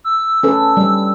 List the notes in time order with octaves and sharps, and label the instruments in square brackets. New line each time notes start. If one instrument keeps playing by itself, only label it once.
[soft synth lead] E6
[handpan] C#4 A4 B4
G3